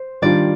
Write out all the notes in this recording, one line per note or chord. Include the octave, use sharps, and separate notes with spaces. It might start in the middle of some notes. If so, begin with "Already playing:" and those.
Already playing: C5
D#3 G3 D4 F4 D5